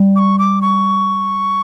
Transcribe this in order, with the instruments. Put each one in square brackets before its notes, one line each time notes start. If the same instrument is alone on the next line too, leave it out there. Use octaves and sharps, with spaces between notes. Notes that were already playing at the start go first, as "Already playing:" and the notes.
Already playing: [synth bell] G3
[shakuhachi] D6
C#6
D6
C#6